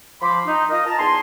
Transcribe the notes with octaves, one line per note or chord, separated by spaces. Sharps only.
F3 B5 C6 D6
D#4
F4 A#4 D#5
A5 A#5
E2 D#4 G#5 A5 C6